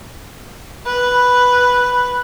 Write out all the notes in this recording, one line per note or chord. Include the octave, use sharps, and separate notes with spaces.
B4